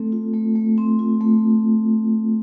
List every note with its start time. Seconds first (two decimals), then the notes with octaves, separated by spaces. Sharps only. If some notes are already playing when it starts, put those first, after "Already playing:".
Already playing: A3 C4 A4
0.12 F4
0.34 A3
0.55 A3
0.78 C4
0.99 F4
1.21 A3